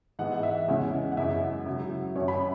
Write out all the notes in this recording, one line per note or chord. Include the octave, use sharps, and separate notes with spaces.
G#2 E3 B3 F#5
E5
E2 C#3 G#3 C#4 E4
F#5
F#2 C#3 G#3 E4 E5
C#3 F#3 E4
F#2 F#3 C#4 C#5
B5